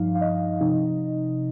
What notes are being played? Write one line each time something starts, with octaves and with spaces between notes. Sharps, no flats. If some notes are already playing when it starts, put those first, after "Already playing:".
Already playing: G2 F3 D#4 F5
F5
D#5
C3 F3 D#4